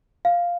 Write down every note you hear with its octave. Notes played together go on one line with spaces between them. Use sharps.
F5